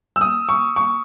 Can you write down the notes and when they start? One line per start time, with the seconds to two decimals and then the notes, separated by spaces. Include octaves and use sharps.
0.16 E6
0.21 D#6
0.49 C#6
0.76 C#6